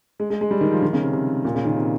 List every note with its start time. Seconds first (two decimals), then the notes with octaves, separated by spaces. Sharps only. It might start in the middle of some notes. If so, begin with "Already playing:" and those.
0.20 G#3
0.30 G#3
0.41 G#3
0.51 G3
0.61 D#3
0.72 F3
0.83 D#3
0.93 C#3
1.03 C3
1.13 C3
1.45 A#2
1.55 C#3
1.65 D#3
1.76 C3